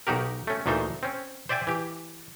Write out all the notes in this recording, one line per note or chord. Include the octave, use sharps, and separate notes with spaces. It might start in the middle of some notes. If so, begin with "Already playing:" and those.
B1 D#4 F#4 G4 A#4
A3 C#4
D2 A#2 E3 A3 D#4 C5
C4 C#4
C5 D5 E5 G5 G#5
E3 G4